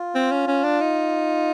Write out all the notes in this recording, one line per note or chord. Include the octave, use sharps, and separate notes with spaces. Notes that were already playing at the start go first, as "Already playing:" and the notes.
Already playing: F4
C4
C#4
C#4
D4
D#4